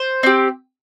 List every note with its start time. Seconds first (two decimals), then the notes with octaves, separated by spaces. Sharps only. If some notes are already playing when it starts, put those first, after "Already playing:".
Already playing: C5
0.23 C4 G4